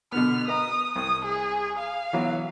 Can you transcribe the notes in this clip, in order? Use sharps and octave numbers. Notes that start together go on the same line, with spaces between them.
B2 D3 B3 F6
B4 D#5 A#5 D#6
C2 D#6
G#4
F5
E3 F#3 B3